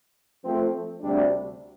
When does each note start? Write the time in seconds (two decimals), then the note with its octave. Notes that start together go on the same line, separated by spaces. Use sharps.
0.44 F3 A3 C4
1.00 D2 C3 G3 D4